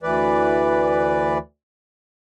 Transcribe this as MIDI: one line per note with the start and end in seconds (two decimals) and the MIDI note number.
0.03 1.38 38
0.03 1.38 52
0.03 1.38 71
0.03 1.38 74